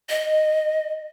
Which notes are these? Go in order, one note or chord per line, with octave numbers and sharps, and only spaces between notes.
D#5